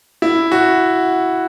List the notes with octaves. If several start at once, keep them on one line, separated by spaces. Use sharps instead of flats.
E4
F#4